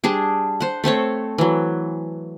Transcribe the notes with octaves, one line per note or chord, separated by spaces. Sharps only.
G3 D4 G#4
C5 F#5
A3 C4 A4 C#5
E3 F#3